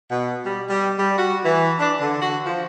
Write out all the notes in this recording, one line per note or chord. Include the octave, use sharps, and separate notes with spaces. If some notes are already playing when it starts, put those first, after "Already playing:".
B2
G3
G3
G3
F#4
E3
D4
D3
F#4
F3